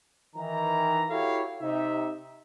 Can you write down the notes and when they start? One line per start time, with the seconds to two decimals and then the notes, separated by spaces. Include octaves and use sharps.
0.36 D#3 E3 A#5
1.10 E4 F#4 G4 A4 C#5 F5
1.61 C3 D#4 E5